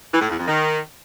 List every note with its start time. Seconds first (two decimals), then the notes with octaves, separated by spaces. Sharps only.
0.13 E3
0.21 A2
0.29 E2
0.38 F2
0.46 D#3